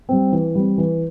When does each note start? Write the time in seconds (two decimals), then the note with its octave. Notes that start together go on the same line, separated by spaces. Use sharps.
0.09 G3 C4
0.32 E3
0.55 G3 C4
0.78 E3